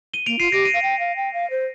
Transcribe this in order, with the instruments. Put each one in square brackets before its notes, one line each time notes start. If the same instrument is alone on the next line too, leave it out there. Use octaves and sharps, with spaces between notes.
[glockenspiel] D#7 G7
[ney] A#3 [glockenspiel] D7 F7
[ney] F4 [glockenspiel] C7 D#7
[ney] G4 [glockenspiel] A#6 D7
[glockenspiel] C7 D#7
[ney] F5
G5
F5
G5
F5
C5